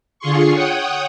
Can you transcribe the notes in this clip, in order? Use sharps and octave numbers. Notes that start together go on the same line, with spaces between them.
D3 F4 G#4 C6 C#6
C#5 F#5 G5 D#6